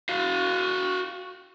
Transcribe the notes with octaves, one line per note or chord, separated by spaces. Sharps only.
F#4 F5